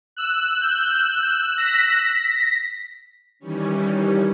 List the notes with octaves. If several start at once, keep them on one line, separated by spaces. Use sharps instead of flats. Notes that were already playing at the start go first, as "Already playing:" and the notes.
E6 F#6
G6
A#6 B6
D#3 E3 G3 C#4